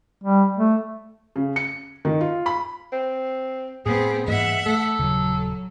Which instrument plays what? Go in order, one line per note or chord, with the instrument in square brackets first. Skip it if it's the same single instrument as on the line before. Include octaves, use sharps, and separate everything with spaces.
[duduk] G3
A3
[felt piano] C#3
C#7
D#3
F4
B5
[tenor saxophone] C4
[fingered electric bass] A2 [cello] B3 C4 [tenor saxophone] G#4
[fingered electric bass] G#2 E3 A#3 [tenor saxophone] G#3 [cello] E5 F#5
[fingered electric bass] A3 [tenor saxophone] A4
[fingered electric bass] D#1 C#3 [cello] F#3